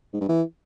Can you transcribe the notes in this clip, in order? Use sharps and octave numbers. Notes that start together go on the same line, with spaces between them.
G#2
G2
E3